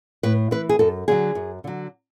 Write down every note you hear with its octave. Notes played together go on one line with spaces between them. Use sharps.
A2 B4
E3 B4
G#4
F#2 A4
D3 F#3 G#4
F#2
D3 F#3